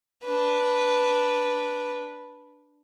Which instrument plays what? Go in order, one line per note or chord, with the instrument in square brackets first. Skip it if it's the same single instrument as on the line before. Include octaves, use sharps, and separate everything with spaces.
[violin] D4 B4